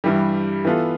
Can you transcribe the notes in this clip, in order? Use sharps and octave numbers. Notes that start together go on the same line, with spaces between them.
G2 E3 G3
E3 B3 F4 A4